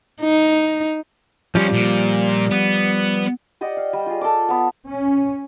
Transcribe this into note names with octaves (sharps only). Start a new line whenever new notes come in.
D#4
F3 G3 C#4 F4
A#2
B3
G4 D5 D#5 F#5
F5
G3
F4 G#4
A4 D6
B3 F#5
C#4